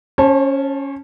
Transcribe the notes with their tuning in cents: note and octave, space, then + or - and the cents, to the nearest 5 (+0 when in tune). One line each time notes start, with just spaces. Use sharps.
C#4 +0 C5 +45 A5 -10